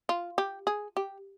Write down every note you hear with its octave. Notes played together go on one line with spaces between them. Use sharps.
F4
G4
G#4
G4